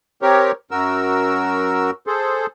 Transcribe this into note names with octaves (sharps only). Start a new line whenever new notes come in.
C4 G4 A#4 C#5
F#2 F#4 A#4 E6
G#4 A4 C5